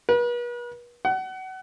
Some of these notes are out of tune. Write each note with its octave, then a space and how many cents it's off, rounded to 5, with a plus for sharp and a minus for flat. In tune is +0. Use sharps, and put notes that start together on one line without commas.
B4 -40
F#5 +30